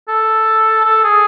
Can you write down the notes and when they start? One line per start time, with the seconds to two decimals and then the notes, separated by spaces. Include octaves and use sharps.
0.08 A4
0.85 A4
1.04 G#4